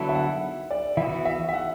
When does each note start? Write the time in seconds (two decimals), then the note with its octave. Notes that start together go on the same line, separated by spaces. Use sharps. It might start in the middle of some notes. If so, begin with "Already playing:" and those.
Already playing: D3 F#3 B3 E4 A4
0.09 E5
0.15 F#5
0.71 D5
0.97 E3 B3 F#4 E5
1.25 E5
1.49 E5
1.53 F#5